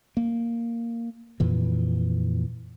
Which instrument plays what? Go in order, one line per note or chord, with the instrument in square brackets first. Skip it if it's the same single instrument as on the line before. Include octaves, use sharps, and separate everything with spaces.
[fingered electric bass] A#3
F2 A#2 E3